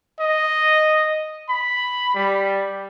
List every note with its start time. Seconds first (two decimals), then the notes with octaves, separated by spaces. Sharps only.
0.20 D#5
1.49 B5
2.15 G3